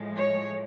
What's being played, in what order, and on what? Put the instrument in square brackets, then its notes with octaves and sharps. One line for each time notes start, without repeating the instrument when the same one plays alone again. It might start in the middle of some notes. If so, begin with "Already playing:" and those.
Already playing: [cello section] A2 F3 G#3
C#5